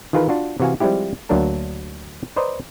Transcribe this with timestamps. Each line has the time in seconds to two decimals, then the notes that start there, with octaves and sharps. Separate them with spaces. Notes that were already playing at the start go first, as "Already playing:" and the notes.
0.13 D#3 E3 F4 G#4 A#4 B4
0.29 D4 F4 F#4
0.60 C3 E3 F#4 F5 G#5
0.80 F3 G3 G#3 C4 E4 G4
1.29 D2 F#3 A#3 D4 A#4 A5
2.36 B4 C5 D5 D#5 A#5